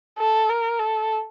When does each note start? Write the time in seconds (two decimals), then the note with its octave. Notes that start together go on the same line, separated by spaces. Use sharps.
0.19 A4
0.49 A#4
0.79 A4